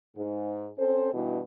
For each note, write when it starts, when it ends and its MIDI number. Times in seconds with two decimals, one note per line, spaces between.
0.15 0.68 44
0.78 1.11 60
0.78 1.11 61
0.78 1.11 69
0.78 1.11 72
1.12 1.39 43
1.12 1.39 47
1.12 1.39 52